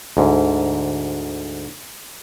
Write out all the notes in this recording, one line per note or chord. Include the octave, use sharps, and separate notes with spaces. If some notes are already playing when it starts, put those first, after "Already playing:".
D2 G#2